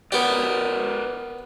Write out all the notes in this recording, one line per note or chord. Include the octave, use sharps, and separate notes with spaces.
B3 G4 A#4 B4 D5